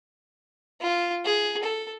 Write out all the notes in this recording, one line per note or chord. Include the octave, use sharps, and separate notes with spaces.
F4
G#4
A4